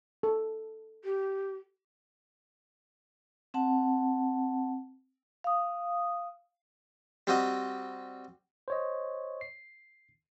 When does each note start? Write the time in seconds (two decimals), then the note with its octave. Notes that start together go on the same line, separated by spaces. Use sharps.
0.23 A4
1.05 G4
3.54 C4 F#5 A5
5.44 F5 D#6
7.27 G3 C4 F#4 D#5
8.68 C5 C#5 D#5
9.41 C7